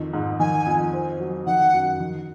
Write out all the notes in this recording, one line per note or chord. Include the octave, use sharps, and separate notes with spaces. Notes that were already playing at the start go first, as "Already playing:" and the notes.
Already playing: F2 D#3
G#2
D#3 G#5
F2
C4
F#3
D#3 F#5
F#2
D#3